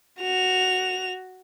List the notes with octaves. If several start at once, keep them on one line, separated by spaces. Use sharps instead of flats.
F#4 F7